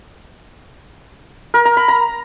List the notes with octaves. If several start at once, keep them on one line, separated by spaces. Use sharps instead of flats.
A#4
A#5
B5
A#5